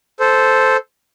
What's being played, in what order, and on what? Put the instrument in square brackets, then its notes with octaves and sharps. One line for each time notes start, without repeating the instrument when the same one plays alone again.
[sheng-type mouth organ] A4 C5